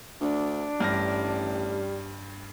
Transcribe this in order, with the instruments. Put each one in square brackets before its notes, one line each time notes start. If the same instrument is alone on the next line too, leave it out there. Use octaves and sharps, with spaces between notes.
[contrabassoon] D2 [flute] D4
[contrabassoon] A1 [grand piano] G2 F6 A#6 [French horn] G3